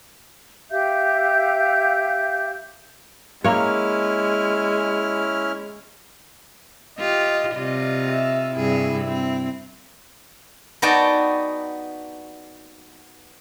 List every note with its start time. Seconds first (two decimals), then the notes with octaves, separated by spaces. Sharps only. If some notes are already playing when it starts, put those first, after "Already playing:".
0.71 G4 E5 F5 G6
3.44 G#3 A#3 C#4 E4 C#5 F6
6.99 F4 G4 D#5
7.55 C3 G3 F4 D#5
8.11 E5
8.56 G2 C3 E4 G#4
9.05 C4
10.82 B3 D#4 F#4 D5 G5 A5